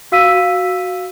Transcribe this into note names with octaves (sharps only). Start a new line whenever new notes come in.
F#4 F5 E6 B6 D#7